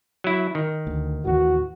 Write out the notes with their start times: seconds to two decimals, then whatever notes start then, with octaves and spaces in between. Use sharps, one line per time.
0.24 F#3 E4
0.55 D#3
0.87 D2
1.25 D#2 A2 E3 F#4